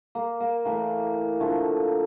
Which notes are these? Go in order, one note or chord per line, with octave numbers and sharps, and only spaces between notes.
A#3
A#3
A2 E3 A3 A#3
D3 F3 A3